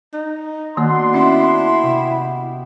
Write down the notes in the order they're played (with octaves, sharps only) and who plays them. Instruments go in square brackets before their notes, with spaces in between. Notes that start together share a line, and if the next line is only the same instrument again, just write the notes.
[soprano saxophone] D#4
[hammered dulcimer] B2 D3 B3 [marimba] D#3 A#3 [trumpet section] D4 C6
[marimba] C#4 [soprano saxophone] E4
[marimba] C3 [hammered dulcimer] G4